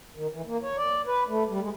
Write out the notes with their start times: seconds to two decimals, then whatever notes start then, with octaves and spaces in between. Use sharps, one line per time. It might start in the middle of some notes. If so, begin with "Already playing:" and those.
0.16 D#3
0.33 E3
0.47 A#3
0.63 C#5
0.77 D5
1.07 B4
1.28 A3
1.49 G3
1.61 G#3